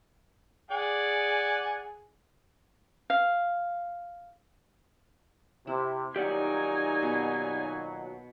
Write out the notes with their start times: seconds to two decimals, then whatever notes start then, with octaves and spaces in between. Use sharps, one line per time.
0.71 G#4 D5 F#5 G#5
3.10 F5
5.67 C3 E4
6.16 A#2 D#3 F#3 D#4 G4 D5 F#5 G#5
7.02 B2